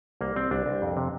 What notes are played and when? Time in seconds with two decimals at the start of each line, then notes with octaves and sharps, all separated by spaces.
0.21 C2 A#3
0.36 C2 C4
0.51 C2 D4
0.66 C2
0.82 F2
0.97 C3